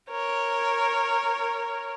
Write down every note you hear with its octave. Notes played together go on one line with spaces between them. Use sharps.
A#4 C#5